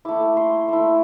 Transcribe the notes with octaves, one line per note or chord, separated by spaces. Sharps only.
A3 E4 D6
C6
A3 E4